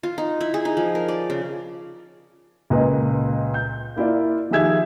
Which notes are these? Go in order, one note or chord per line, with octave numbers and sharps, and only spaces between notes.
F4
D#4
E4
G#4
D#4
F3
A#4
D5
C#3
C#2 A#2 B4 D#5
G6
A#3 E4 F4 D5
D#3 F3 G4 G#4 E5 G#6